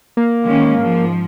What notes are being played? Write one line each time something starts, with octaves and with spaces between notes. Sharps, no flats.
A#3
D#3 G#3 C#4
G#2 F3